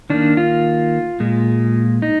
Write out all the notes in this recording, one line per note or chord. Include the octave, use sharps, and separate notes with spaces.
D#3 A#3 D4
F4
A#2 G#3
D#4